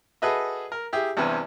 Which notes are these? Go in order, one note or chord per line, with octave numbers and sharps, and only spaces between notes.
F#4 G#4 A4 B4 D#5 E5
A#4
E4 G4 G#4
E2 G2 C3 B4